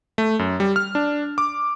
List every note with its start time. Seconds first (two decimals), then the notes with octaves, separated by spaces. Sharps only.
0.18 A3
0.39 F#2
0.60 G3
0.76 F6
0.95 D4
1.38 D6